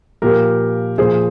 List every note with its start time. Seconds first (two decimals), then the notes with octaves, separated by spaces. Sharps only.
0.22 A#2 F3 G4 A#4
0.98 A#2 F3 G#4 C5